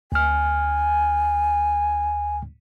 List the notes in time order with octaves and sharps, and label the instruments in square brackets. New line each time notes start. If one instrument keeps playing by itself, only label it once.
[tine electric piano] D2 F6 [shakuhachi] G#5